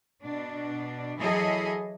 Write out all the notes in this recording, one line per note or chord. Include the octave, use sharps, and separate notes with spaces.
B2 D4
E3 F#3 E4 G#4 A4 D#5